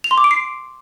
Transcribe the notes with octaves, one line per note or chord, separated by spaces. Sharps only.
F7
C6
D6
D7
C7